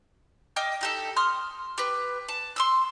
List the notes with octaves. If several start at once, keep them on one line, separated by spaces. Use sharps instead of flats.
D#5 G5 D6 F6
D#4 G4 A4
C6 D#6 F6
G4 B4
A5
C6 D#6 E6